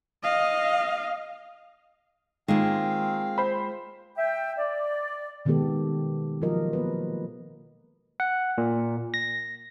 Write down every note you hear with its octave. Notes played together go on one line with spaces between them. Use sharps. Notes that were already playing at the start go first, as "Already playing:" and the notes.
D#5 F5
D#3 G#3 A#3 C4 F4 F5
C5 B5
E5 G5
D5
B2 D#3 G#3 B3 G4 A4
F3 F#3 F4 F#4 A#4 D#5
A#3 B3 B4
F#5
A#2
A#6